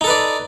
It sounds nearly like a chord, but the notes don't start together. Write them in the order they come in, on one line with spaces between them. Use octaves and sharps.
D#4 A4 B4 D5